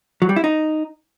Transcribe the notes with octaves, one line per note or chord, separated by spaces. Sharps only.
F#3
G3
E4
D#4